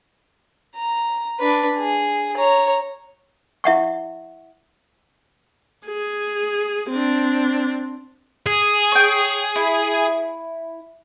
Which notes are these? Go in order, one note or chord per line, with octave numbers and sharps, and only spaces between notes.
A#5
D4 B4
G#4
C#5 A#5
E4 E5 F#5 C#6
G#4
C4 D4
G#4
C#5 G5
E4